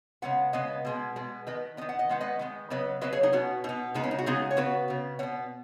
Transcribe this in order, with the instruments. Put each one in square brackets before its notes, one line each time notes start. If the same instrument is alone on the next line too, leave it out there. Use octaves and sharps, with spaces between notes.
[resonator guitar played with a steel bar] C#3 G#3 B3 F#5
C#3 G#3 B3 B4 D#5
B2 G#3 B3
B2 G#3 B3
D#3 B3 B4 D#5
D#3 B3 D#5
F#5
D#5
D#3 G#3 B3 F#5
B4 D#5
D#3 G#3 B3
C#3 F#3 B3 B4 D#5
C#3 F#3 B3 B4 D#5
G#4 C#5
D#4 G#4
B2 B3 C#4 F#4
B2 D#4
B3
C#3 G#3 B3 D#4
C#4
D#4
F#4
C#3 G#3 B3 D#4 G#4
C#5
C#3 B3 F#4 B4
C#3 B3
B2 B3 C#5 F#5